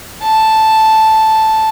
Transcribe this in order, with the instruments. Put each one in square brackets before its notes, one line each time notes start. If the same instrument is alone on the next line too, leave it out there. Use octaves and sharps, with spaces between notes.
[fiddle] A5